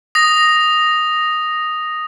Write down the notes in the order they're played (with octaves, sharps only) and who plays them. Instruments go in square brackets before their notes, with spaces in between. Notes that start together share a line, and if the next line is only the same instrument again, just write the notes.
[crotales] D#6 A#6